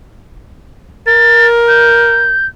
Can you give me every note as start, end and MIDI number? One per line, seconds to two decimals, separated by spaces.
1.07 2.38 70
1.07 1.47 93
1.68 2.46 91